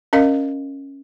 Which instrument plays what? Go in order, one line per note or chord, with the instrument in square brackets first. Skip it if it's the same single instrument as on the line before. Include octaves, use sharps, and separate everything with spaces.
[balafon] C#4 A#4 D#5 F5